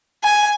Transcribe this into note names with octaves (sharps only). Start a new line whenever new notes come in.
G#5